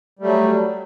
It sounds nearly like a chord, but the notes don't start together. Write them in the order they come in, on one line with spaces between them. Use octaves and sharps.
G3 A3 F#3